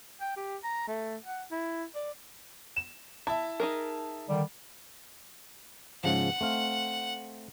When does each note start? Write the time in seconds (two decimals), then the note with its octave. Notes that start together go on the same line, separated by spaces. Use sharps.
0.21 G5
0.36 G4
0.64 A#5
0.87 A3
1.25 F#5
1.51 E4
1.95 D5
2.76 E7
3.27 E4 E5 A5
3.60 D#4 G#4 A#4
4.30 D3 D#3 G3
6.04 G#2 C#3 F3 F#5
6.41 A3 C4 F5